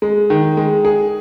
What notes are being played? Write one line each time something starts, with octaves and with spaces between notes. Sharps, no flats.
G#3
D#3
G#3
G#4